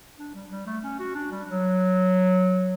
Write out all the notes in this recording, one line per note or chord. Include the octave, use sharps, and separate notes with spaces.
D4
G3
G3
A3
C#4
F#4
D4
G3
F#3